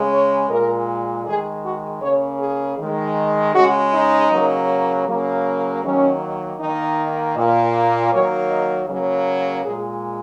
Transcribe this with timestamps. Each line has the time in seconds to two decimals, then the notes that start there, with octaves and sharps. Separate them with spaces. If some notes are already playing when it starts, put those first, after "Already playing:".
Already playing: C#3 G#3
0.12 C#5
0.50 A#2 G#3 A#4
1.26 D#3 G#3 G#4
1.65 F#4
2.02 C#3 A#3 C#5
2.41 G#4
2.79 D#3 G#3
3.55 C#3 G#3 F#4
3.93 D#4
4.31 C#3 F#3 A#3
5.08 C#3 F#3 A#3
5.84 D#3 F#3 A#3 C#4
6.60 D#3 A#3 D#4
7.37 A#2 A#3
8.13 D#3 F#3 A#3 C#5
8.51 D#5
8.89 C#3 F#3 A#3
9.65 A#2 G#3 G#4